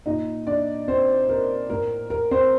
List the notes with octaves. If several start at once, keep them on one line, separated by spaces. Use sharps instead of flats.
A#2 D#4 D#5
D4 D5
C4 C5
A#4
A2 A#4
A#4
C4 C5